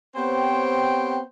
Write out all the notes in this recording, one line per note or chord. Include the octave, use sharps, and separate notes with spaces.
B3 C4 G4 C5 C#5 G5